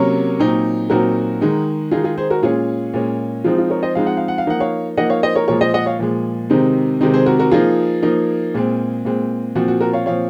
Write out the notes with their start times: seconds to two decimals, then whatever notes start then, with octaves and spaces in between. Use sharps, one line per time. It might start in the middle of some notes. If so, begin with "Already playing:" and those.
Already playing: C3 F#3 A#3 C#4 A#4 C#5
0.40 A#2 F#3 C4 D#4
0.90 A#2 F#3 C4 D#4 F#4 A#4
1.41 D#3 G#3 D#4
1.91 D#3 G#3 D#4 F4 G#4
2.04 F4 G#4
2.18 G#4 C5
2.30 F#4 A#4
2.42 A#2 G#3 C#4 F4 G#4
2.94 A#2 G#3 C#4
3.44 F3 G#3 C4 D#4 F4
3.58 F4
3.70 A#4 C#5
3.83 C5 D#5
3.95 F3 G#3 C4 D#4 F5
4.06 F#5
4.17 F5
4.28 F#5
4.38 F5
4.47 F3 A#3 D#4 F#5
4.60 C#5 F5
4.97 F3 A#3 D#4 D#5 F#5
5.10 C#5 F5
5.23 C5 D#5
5.35 A#4 C#5
5.48 A#2 F3 G#3 A#4 C#5
5.61 C5 D#5
5.74 D#5 F#5
5.86 C#5 F5
5.99 A#2 F3 G#3
6.50 C3 D#3 G#3 C4 D#4
7.01 C3 D#3 G#3 C4 D#4
7.13 G#4 C5
7.26 F#4 A#4
7.39 F#4 A#4
7.51 F3 A#3 D#4 F4 G#4
8.02 F3 A#3 D#4
8.54 A#2 G#3 C4
9.05 A#2 G#3 C4
9.55 A#2 F3 C4 F#4
9.68 F#4
9.81 F#4 A#4
9.93 C#5 F5
10.06 A#2 F3 C4 C#5 F5